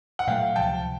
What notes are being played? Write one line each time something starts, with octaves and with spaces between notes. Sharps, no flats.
F#5
A#2 F#3 A3 F5 G5
C#2 C3 F3 G5 A5